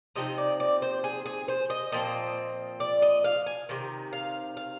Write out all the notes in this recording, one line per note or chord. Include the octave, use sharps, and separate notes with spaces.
C3 F3 C4 D#4 D#5
D5
D5
C5
G#4
G#4
C5
D#5
A#2 F3 C4 D#5
D5
D#5
F5
G#5
C3 D#3
F5
F5